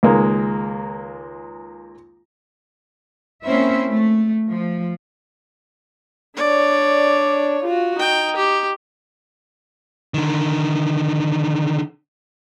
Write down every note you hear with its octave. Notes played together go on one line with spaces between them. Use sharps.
C#2 D#3 G#3 A#3
A#3 C4 C#4 E4 C5 E5
A3
F3
D4 C#5 D5
F4 F#4
D#4 G5
G4
D3 D#3